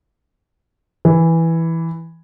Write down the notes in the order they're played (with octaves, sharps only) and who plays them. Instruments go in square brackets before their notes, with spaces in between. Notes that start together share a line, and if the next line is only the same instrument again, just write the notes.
[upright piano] E3